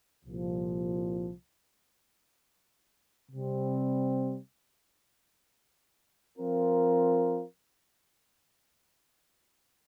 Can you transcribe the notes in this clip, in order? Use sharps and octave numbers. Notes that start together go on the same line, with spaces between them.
C2 A#2 F3
C3 G3 C4
F3 C4 F4 A#4